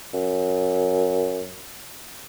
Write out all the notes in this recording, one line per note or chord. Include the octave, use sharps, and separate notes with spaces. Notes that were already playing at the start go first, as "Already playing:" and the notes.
F#2